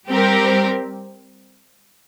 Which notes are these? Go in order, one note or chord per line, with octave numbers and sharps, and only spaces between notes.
G3 C4 G4 A#4